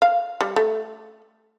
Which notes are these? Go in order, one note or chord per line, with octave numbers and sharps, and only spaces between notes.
F5
G3
A3